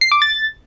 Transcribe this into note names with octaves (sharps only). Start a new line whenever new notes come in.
C7
D6
A6